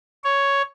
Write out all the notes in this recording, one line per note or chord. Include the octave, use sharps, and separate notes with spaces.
C#5